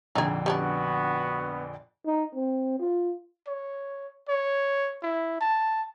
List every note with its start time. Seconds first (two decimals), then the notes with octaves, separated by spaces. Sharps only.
0.15 A#1 F2 D3 D#4 G#4
0.46 G3 B3 C#4 D4 F#4
2.06 D#4
2.35 C4
2.80 F4
3.47 C#5
4.29 C#5
5.03 E4
5.41 A5